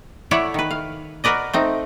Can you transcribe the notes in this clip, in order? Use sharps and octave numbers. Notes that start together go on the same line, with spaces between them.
A3 E4 C#5 D5 E5 F#5
D#3 B4
F5
F#4 A#4 B4 D5 D#5
A3 C4 D#4